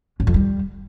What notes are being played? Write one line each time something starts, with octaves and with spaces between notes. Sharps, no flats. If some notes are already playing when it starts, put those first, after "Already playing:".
F#2
F2
G3